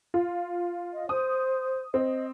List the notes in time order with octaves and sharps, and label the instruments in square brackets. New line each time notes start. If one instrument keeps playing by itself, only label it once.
[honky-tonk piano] F4
[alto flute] D#5
[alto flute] C5 [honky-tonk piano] D#6
[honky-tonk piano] C4 [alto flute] D#5